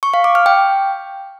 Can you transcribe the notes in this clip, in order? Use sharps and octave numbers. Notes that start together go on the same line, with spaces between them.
C#6
F5
D6
F6
G5